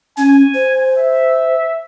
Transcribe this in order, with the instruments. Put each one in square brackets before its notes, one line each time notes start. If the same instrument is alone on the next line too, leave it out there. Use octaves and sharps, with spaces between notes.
[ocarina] C#4 [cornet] G#5
[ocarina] C5
[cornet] E5